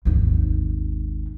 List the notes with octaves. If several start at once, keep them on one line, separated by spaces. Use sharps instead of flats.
G#1 D#2